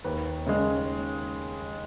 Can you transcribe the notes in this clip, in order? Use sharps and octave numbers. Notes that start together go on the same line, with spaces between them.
D#2 B4
C#3 G#3